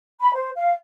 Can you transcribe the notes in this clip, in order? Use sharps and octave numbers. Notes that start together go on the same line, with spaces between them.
B5
C5
F5